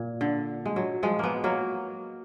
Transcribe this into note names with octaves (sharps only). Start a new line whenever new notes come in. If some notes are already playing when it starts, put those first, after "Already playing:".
Already playing: A#2
D3
G#3
F#3
F3 G#3
G#3 A#3 B3
F#3 A#3